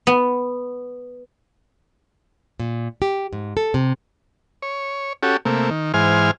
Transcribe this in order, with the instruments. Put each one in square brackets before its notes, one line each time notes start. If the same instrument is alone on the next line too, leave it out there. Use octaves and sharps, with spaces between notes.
[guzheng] B3
[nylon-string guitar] A#2
G4
G#2
A4
C3
[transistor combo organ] C#5
C#4 F#4 G4 A4
C3 A3 A#3
D#3
G#2 E3 C5 G#5 F6